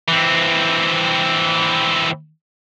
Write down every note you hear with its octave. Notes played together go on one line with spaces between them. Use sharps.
E3 C4